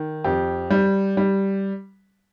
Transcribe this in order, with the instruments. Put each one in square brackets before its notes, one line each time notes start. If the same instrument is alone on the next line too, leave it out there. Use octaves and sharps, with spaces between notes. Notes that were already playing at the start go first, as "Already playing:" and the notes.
Already playing: [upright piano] D#3
F2 G4
G3
G3